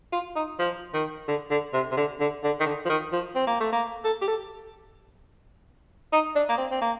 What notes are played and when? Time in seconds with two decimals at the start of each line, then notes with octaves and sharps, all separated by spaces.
0.13 F4
0.36 D#4
0.59 F3
0.94 D#3
1.28 D3
1.51 D3
1.74 C3
1.91 C3
1.97 D3
2.20 D3
2.44 D3
2.60 D#3
2.66 D3
2.85 F3
2.90 D#3
3.13 F3
3.36 C4
3.47 A#3
3.60 A3
3.73 A#3
4.05 A4
4.22 G4
4.28 A4
6.13 D#4
6.36 D4
6.49 A#3
6.58 C4
6.71 C4
6.82 A#3